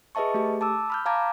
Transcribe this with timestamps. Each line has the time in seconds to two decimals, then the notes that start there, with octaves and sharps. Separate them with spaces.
0.15 G#4 B4 D#5 E5 A5 C#6
0.34 A3 G4
0.61 A5 D6 E6
0.90 B5 F6 G6
1.06 F5 A5 A#5 D6 G#6